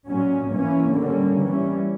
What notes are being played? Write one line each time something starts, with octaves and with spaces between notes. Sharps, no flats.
A#2 F#3 C#4
E3 A#3 C#4
D3 G3 A#3 C#4
E3 G3 C#4